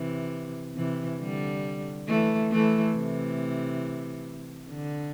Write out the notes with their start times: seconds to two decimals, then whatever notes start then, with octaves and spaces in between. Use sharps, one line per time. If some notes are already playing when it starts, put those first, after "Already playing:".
Already playing: C3 E3
0.77 C3 E3
1.20 D3 G3
2.08 E3 A3
2.51 E3 A3
2.95 C3 E3
4.70 D3